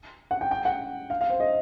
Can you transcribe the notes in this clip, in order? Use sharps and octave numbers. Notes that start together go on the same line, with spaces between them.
F#5
G5
G5
F#5
F5
F5
C5
D#5